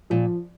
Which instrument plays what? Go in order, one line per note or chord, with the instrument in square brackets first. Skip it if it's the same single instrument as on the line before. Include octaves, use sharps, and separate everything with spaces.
[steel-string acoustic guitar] A#2 [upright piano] F3